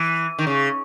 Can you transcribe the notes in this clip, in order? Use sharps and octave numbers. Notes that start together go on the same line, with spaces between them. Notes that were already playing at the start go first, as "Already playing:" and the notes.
Already playing: E3
D#3
C#3